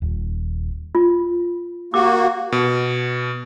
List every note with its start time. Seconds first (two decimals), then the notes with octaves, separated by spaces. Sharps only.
0.02 D#1
0.95 F4
1.94 A#3 F#4 G4 D6
2.52 B2